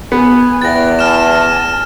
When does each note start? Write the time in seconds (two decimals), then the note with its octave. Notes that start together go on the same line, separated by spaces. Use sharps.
0.12 B3 G#5
0.62 E2 G5 F#6 A6 A#6
0.99 G#5 A5 F6 E7